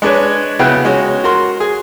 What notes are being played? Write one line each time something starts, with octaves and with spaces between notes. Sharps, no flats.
G#3 D4 B4 C#5
C#3 B3 E4 F#4 F#5 G5
G#3 C#4 F#4
F#4 A#4 C6
G#4